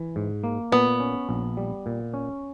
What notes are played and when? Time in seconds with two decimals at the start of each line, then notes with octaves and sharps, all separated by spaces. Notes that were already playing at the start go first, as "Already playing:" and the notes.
Already playing: E3
0.16 G#2
0.44 A#3
0.72 A#2 B3
1.00 C#4
1.29 A#1
1.57 G3
1.86 A#2
2.14 C#4